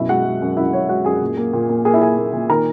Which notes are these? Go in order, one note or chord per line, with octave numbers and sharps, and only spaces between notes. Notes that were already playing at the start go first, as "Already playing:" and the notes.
Already playing: F#2 B2 E4 E5
G#3 F#4 F#5
G#3
F#2
F#2 E4 E5
F#2 C#5
G#3 F#4 F#5
F#2 G#4 G#5
A#2
A#3
A#2
A#3
A#3 G#4 G#5
E4 E5
A#3 G#4 G#5
A#3
A#2
D#3 A#4 A#5